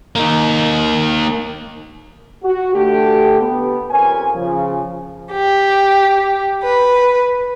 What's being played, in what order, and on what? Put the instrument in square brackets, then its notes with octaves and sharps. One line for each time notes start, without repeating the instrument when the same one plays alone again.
[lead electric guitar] A#3 D#4
[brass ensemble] F#4
D3 A3 G4
B3
F2 C#4 A#4 G#5
C#3 F3
[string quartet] G4
B4